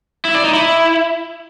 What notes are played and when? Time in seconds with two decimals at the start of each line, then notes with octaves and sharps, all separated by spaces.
0.25 E4
0.35 D5
0.44 D#4
0.54 E4